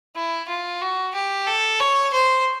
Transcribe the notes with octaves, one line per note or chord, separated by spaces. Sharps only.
E4
F4
F#4
G4
A4
C#5
C5